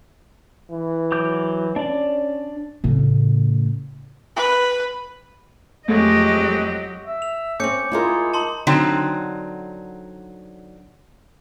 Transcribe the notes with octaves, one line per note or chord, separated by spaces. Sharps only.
E3
F#3 D6 G6
C#4 D4 D5
A2 C#3
B4
F2 F#3 G#3 A3 G4 D#5
E5
F7
C4 C#4 D6 G6 C#7
G#3 E4 F4 A#4
D#4 A5 C6 F#7
D3 F#3 C4 D#4